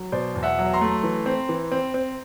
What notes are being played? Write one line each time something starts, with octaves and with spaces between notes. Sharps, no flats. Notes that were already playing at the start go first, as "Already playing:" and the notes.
Already playing: F#3
B2 C5 D5
E2
E5 F#5
F#3
A#5 C6
A3
E3
C4
E3
C4
C4